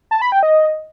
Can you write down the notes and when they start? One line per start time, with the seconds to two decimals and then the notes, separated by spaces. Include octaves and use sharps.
0.11 A5
0.22 B5
0.32 G5
0.43 D#5